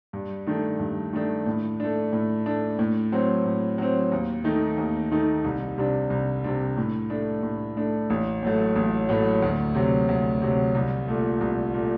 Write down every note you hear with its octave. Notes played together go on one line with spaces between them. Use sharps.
G2
D#3 A3 D4
G2
D#3 A3 D4
A2
A3 D4
A2
A3 D4
A2
F#3 C4
A2
F#3 C4
D#2
D#3 A3 D#4
D#2
D#3 A3 D#4
C2
C3 G3 D4
C2
C3 G3 D4
A2
A3 D4
A2
A3 D4
A1
A2 F#3 A3
A1
A2 F#3 A3
D2
C3 F#3
D2
C3 F#3
C2
A#2 A3
C2
A#2 A3